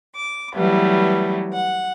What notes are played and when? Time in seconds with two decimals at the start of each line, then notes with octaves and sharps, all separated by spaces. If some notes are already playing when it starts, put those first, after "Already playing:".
0.15 D6
0.55 E3 F#3 G3 A3 B3
1.53 F#5